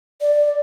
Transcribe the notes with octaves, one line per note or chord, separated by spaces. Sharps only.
D5